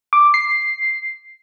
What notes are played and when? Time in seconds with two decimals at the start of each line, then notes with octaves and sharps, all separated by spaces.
0.13 D6
0.34 C7